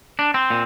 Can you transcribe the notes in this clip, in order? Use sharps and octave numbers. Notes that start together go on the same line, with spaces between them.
D4
C4
A#2